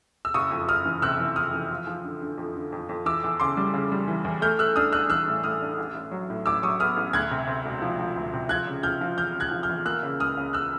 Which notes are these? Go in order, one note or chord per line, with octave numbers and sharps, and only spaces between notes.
E6
F#1 C#6 D#6
F2
F#1 D#6 F6
E3
C3 E6 F#6
E3
F2 D#6 F6
E3
F3
F3
D3
D3
F2
D3
F2
F2
E3 D6 E6
E2
C#3 C6 D6
G3
C#3
G3
E3
E2
A3 F6 G6
A3 E6 F#6
D4 D#6 F6
D4 E6 F#6
E3 E6 F#6
A2
A2 D#6 F6
D4
A1
A1
F#3
A2
A1 D6 E6
F#3 C#6 D#6
B3 D#6 F6
A1
D2 F#6 G#6
C3
C3
E1
F3
F3
D2
C3
F3 F#6 G#6
C#3
F3 F6 G6
F3
E2 F6 G6
C#3
F#6 G#6
F3
F6 G6
E2
A#3 E6 F#6
C#3
C#2 D#6 F6
C#3
E6 F#6